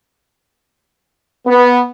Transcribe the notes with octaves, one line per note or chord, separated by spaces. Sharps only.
B3